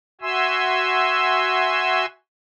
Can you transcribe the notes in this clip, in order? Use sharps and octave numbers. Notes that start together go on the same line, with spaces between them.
F#4 E5 G#5 C6 E6